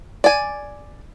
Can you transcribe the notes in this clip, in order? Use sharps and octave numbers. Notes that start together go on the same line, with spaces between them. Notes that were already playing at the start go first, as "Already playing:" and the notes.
D5 G#5